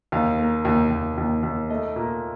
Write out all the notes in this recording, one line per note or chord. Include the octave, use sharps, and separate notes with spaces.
D#2 F5
A#3
D#2
D#2
D#2
D#2
A3 D#5
A#2